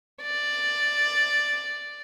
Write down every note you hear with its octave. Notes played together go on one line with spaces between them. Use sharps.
D5